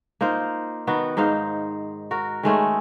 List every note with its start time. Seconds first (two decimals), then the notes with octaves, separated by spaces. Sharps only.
0.21 A#3 D#4 F4 C5
0.87 D#3 B3 F#4
1.17 G#2 D#4 C5 F5
2.11 F#4 A#4
2.43 D#3 G#3 A3 C#4